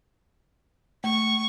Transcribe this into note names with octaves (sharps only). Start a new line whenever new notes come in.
A3 C#6